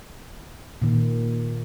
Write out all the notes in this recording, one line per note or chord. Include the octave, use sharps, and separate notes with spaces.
A#2 D#3